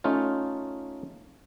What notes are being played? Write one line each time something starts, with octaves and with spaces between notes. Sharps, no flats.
A3 C#4 D#4 F4